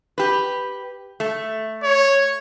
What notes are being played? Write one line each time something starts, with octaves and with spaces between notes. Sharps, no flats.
G4 B4
A3
C#5